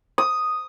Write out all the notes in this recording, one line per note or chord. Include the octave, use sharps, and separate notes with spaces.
D#6